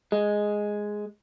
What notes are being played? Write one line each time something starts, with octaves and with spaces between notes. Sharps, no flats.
G#3